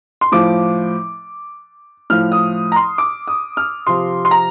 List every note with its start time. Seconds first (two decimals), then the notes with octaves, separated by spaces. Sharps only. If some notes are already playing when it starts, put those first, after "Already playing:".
0.21 C6
0.32 A2 F3 D6
2.10 A2 F3 F6
2.32 D#6
2.72 A#5
2.76 C6
2.98 D6
3.27 D#6
3.57 F6
3.87 C3 F3 C6
4.25 C6
4.31 A#5